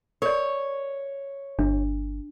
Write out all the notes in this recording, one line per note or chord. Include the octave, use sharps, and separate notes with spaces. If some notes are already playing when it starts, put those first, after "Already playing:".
A#4 C#5 D5
G1 D4